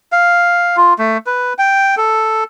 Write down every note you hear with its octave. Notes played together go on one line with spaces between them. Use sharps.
F5
F4
A3
B4
G5
A4